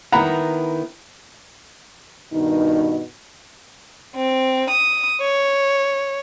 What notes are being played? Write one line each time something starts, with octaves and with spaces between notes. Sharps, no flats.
D#3 B3 E4 F#5 A#5 B5
G2 B2 D#3 D#4
C4
D#6
C#5